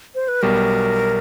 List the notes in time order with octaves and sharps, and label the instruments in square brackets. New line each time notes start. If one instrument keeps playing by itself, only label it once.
[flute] C5
B4
[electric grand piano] B1 B2 G3 [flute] A#4